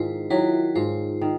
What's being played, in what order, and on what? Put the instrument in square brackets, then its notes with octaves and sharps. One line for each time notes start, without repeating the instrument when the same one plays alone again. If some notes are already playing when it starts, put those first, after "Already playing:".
Already playing: [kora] G#2 D#3 [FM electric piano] E4 F4
[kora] D#3 F#3 [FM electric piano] E4
[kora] G#2 [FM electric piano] F4
[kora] D#3